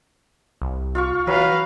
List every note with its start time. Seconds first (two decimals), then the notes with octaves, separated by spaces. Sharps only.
0.62 C2
0.95 F4 F5 C#6
1.27 E3 F#3 B4 F5